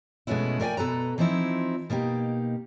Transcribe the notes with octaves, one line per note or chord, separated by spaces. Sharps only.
B2 G#3 A3 B3 C#4 E4
A3 A#4 D5 F5 G5 G#5
B2 A4 B4 A#5
E3 F3 C4 D#4 E4
B2 A#3 D#4 G4